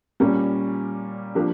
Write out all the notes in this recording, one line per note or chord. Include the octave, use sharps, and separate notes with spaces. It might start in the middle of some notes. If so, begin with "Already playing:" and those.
A#2 G3 A#3 C#4
F3 A#3 D4 G4